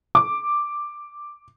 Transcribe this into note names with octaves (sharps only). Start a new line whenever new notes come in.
D6